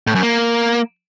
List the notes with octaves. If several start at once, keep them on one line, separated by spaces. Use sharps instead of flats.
A2
F#2
A#3